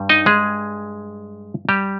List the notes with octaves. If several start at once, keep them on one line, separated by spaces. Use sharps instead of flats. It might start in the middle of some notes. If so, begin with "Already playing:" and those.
Already playing: G2 G3
D#4 D#5
G#3 G#4
G3 G4